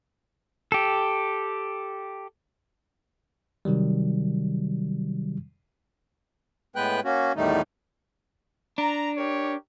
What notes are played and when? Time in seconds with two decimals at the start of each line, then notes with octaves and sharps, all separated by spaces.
0.72 G4 A4
3.65 C3 D#3 F#3 G3
6.76 A2 G#3 B3 B4 G5 F#6
7.04 A#3 C#4 F#4
7.36 E2 A2 D#3 G3 A3 D#4
8.78 D4 A#5
9.16 G4 A#4 C#5